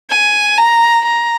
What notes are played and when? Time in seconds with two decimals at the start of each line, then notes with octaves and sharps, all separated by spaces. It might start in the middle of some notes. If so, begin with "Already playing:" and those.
0.10 G#5
0.58 A#5
1.06 A#5